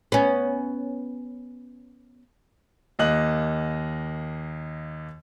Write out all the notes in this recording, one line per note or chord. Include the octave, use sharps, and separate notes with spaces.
B3 C#4
D#2 A#3 D#5 F#6 F#7